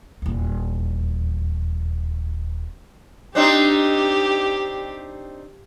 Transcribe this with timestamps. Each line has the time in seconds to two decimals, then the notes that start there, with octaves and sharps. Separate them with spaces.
0.22 D#1 E2
3.35 C4 D4 D#4 G4